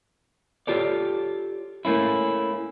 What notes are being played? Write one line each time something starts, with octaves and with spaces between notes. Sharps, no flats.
F4 G4 A4 C#5 D5
A3 A#3 C#4 E4